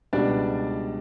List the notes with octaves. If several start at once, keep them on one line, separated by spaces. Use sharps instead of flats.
C#2 B2 G3 D4 D5